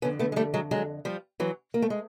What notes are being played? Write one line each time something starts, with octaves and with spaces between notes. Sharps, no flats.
F2 D3 B3 C#4
A3 B3
G#3
G3 A3
F#3 G#3
F#3 G#3
F3 G3
E3 F#3
A#3
A3
G#3